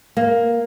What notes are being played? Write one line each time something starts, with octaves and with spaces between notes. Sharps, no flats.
A#3